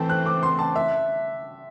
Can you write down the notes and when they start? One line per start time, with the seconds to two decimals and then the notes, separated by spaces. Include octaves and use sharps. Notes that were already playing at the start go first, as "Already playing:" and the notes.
Already playing: E3 A3 C4 G5 A5
0.09 F#6
0.26 D6
0.43 C6
0.59 A5
0.76 E5